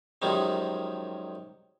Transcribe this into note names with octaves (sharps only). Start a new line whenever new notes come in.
F#2 D#3 F3 G3 G#3